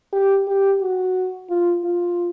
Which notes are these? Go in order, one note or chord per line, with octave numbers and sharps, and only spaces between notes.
G4
G4
F#4
F4
F4